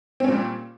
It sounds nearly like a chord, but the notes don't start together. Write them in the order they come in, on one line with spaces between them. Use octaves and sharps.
C4 C#4 A#2 G3